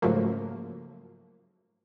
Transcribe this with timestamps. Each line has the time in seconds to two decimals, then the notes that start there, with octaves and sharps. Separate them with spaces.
0.02 G#2 C#3 F3 F#3 A3 A#3